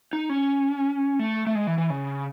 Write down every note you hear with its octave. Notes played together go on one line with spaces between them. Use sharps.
D#4
C#4
A3
A3
G#3
E3
E3
C#3